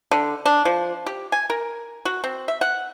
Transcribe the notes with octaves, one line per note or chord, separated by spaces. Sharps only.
D3
D4
F3
G4
G#5
A#4
F#4
C4
E5
F#5